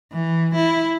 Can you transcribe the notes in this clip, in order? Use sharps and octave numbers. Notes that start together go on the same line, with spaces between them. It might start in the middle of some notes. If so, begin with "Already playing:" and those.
E3
E4